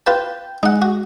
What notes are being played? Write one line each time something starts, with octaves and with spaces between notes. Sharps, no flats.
F4 B4 G5 A5 G6
G#3 D#4 F#5
F#4